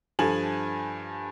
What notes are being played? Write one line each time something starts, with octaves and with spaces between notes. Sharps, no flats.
G2 F3 A4 G#5 F#7